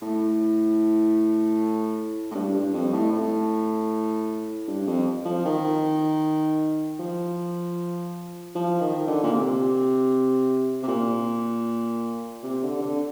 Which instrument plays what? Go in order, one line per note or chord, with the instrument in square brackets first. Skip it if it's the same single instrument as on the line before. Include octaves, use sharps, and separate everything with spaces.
[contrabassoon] A2
A2
G2
G2
F2
A2
A2
G2
F2
F3
D#3
F3
F3
D#3
D3
A#2
C3
C3
A#2
C3
D3
D3